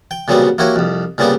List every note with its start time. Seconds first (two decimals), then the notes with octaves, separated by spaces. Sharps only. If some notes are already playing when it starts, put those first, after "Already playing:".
0.11 G5
0.28 A#2 C#3 F#3 G3 B3 C4
0.58 A#3 E4 F#4 G4 C#5
0.76 C2 F2
1.18 A#2 C#3 G3 B3 C4 G4